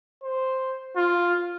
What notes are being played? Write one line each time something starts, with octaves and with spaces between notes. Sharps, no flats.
C5
F4